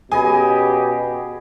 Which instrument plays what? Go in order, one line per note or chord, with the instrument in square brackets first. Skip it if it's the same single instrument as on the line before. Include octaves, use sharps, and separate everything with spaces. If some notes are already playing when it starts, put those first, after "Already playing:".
[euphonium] B2 [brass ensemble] C#4 G4 [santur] G#4 D#5 B5 [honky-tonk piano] G#5